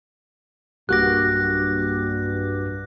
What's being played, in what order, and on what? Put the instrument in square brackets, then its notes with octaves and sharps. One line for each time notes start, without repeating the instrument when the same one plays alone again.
[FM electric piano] B1 A#3 D6 [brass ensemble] G2 [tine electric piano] F#4 G4 [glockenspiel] F#6 A#6